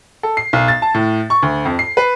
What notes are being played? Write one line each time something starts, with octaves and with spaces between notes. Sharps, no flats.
A4
C7
B1
A6
A5
A2
C#6
D2
F2
C7
B4